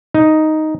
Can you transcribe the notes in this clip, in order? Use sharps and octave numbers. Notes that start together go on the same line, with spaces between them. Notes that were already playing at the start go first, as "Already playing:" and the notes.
D#4